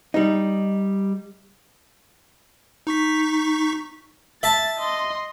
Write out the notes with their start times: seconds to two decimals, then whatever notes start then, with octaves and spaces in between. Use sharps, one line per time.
0.14 G3 D#4
2.87 D#4 C#6 B6
4.43 E5 A5 A6
4.79 D#5 C6